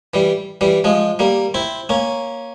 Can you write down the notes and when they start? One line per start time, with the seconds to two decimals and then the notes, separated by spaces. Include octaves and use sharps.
0.14 E3 G3
0.61 E3 G3
0.84 F3 G#3
1.19 G3 A#3
1.54 C4 E4
1.89 A#3 C#4